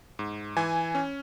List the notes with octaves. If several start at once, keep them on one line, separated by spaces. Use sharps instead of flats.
G#2
E3 G#5
C#4